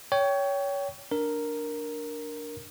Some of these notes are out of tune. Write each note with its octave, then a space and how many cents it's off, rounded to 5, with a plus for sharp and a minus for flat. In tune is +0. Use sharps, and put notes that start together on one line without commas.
C#5 +20 G5 -5
D4 +0 A#4 +0